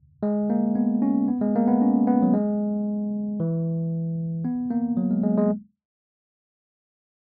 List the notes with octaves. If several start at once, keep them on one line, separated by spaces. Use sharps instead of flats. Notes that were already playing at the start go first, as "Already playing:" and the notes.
G#3
A#3
B3
C#4
B3
G#3
A#3
B3
C#4
B3
F#3
G#3
E3
B3
A#3
F#3
G#3
G#3
G#3